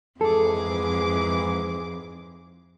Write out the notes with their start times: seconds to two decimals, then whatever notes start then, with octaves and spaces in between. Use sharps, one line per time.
0.21 F2 G#2 E3 G#4 A4 D6